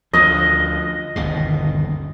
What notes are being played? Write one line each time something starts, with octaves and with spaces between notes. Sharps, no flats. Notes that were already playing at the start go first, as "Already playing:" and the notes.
D2 F3 D#5
G1 D#2 B2